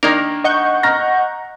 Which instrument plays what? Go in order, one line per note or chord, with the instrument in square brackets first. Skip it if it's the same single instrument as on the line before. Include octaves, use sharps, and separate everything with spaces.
[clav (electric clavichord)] D#3 A#3 A#4 [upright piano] D4 D#4
[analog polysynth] D#5 C#6 G6 [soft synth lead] F#5
[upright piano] A#5 F6 A#6